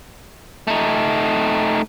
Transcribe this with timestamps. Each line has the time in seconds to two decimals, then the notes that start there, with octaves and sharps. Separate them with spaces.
0.67 A3 D#4